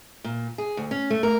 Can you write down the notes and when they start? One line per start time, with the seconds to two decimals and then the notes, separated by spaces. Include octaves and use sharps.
0.24 A#2
0.58 G#4
0.77 D2
0.91 C#4
1.10 A3
1.23 A#4